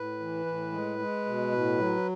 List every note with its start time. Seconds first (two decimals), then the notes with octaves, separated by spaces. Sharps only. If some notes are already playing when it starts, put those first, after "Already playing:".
Already playing: A2 B4
0.20 E3
0.46 A2
0.72 G#3
0.99 G#3
1.26 B2
1.52 A2
1.78 F#3